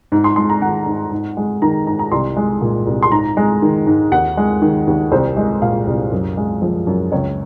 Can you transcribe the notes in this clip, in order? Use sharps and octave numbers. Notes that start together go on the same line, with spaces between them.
G#2 A#5
C6
G#3 C6
A#5
D#3 F#5
G#2
G#2
G#3
D#3 A#5
G#2 A#5
A#5
C2 C6
G#3
A#2
C2
C6
G#2 A#5
G#3
D#3
G#2
D#2 F#5
G#3
D#3
D#2
C2 C5
G#3 D#5
A#2 F5
C2
F#2
G#3
F3
F#2
C#2 C#5